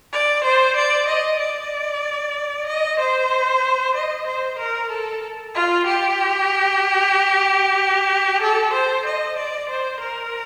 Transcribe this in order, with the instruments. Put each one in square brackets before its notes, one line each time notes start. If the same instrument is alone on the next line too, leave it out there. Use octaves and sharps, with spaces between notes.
[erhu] D5
C5
D5
D#5
D5
D#5
C5
D#5
C5
A#4
A4
F4
G4
A4
C5
D#5
D5
C5
A#4